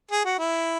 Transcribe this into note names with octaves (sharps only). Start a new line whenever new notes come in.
G#4
F#4
E4